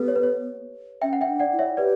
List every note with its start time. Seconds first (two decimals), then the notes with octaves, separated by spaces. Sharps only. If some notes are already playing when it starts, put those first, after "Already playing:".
Already playing: B3 G4 A4 B4
0.08 C#5
0.16 B4
0.23 C#5
1.01 C#4 E5 G5
1.13 F#5
1.21 E5 G5
1.27 D4
1.40 D5 F#5
1.53 E4
1.59 C#5 E5
1.77 G4 B4 D5